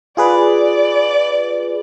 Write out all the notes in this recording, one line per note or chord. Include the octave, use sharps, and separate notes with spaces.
F4 G#4 B4 D5